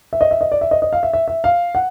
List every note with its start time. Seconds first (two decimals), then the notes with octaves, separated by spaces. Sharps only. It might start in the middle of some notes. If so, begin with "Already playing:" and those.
0.13 E5
0.21 D#5
0.31 E5
0.41 D#5
0.52 D5
0.61 E5
0.71 D#5
0.82 D#5
0.93 F5
1.03 E5
1.13 E5
1.28 E5
1.44 F5
1.75 F#5